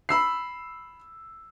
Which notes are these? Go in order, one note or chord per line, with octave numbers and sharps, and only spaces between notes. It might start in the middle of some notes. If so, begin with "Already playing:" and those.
B5 E6 C7